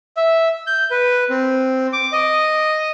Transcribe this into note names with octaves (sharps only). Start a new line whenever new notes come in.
E5
G6
B4
C4
D6
D#5